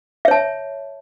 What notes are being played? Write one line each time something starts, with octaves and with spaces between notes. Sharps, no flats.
C#5 E5 A5